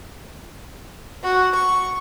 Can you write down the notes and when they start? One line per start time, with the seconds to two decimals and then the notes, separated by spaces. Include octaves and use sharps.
1.23 F#4
1.55 C#6